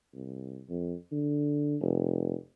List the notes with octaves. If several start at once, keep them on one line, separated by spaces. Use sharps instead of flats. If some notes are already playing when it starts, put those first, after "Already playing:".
C2
F2
D3
F1